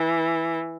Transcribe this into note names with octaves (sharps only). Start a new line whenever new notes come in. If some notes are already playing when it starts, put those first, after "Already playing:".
Already playing: E3